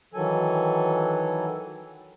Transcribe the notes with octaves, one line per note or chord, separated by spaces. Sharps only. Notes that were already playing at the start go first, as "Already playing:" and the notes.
D#3 E3 F#3 A4 G#5